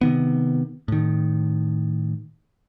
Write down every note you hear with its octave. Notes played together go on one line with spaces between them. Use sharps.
C3 D#3 B3
A2 D#3